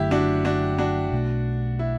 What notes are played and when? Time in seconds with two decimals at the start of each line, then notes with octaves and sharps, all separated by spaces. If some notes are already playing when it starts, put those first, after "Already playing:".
Already playing: F#1 F#2 D3 A3 E4 G4
0.11 D4 F#4
0.45 D4 F#4
0.78 D4 F#4
1.12 B1 B2 A3
1.79 E4